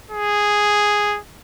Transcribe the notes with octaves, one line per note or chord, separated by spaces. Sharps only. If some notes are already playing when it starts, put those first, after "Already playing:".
G#4